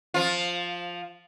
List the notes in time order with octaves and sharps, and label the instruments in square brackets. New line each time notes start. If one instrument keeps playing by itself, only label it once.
[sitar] F3 F4